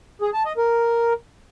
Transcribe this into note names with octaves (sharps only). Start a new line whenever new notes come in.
G#4
A5
D#5
A#4